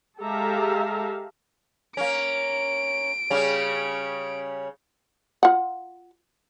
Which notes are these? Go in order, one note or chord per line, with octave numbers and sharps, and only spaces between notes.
G#3 G4 A4 E5 F5 A#5
A#3 C#4 D7
C#3 G3 C#4
F4 F#5